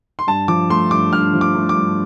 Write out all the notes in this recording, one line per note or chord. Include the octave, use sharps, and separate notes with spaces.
C6
G2 A5
F3 D6
A3 C6
G2 D6
G2 F6
F3
D6
A3
D6
G2